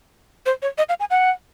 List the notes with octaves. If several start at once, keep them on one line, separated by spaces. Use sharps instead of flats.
C5
C#5
D#5
F5
G#5
F#5